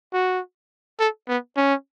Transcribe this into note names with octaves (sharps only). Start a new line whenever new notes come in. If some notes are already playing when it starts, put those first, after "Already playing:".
F#4
A4
B3
C#4